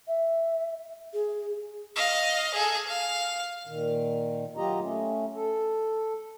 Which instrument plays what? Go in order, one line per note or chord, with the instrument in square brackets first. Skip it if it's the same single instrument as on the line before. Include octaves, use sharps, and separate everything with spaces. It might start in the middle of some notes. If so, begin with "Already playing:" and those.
[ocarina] E5
G#4
[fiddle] D#5 F5
G#4 A4
F5
[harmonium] A#2 D#3
F#3 F4 G4 D#5 A#5
A3 C#4
A4